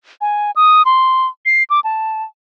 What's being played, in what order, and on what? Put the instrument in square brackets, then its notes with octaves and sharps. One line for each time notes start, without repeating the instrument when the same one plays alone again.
[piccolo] G#5
D#6
C6
C7
D6
A5